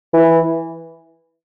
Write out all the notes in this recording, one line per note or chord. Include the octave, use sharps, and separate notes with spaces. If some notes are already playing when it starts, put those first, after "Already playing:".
E3